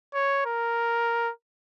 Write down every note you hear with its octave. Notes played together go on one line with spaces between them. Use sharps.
C#5
A#4